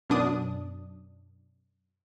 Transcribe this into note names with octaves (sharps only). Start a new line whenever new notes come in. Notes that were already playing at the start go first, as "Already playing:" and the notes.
F#2 B2 D4 D#6